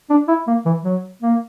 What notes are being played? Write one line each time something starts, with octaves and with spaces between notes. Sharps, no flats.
D4
E4
A#3
E3
F#3
A#3